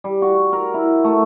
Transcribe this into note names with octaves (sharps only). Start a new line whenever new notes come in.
G3
F#4
A#4
E4
A3